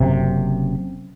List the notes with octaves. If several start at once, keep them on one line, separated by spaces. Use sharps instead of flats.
F#1 F#2 C3